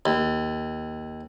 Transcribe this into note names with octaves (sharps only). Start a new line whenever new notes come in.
D#2